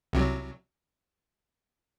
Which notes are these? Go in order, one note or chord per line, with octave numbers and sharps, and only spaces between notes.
C2 C3 F#3